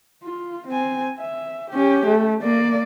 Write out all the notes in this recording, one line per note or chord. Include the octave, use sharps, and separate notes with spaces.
F4
C4 G#5
E5
C#4 G4
A3
A#3 D5